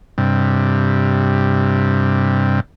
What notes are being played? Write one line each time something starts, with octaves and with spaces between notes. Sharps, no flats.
G2 C3